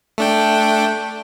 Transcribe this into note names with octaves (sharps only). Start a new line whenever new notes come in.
A3 D4 G5